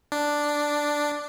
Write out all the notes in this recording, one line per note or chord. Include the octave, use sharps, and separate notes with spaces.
D4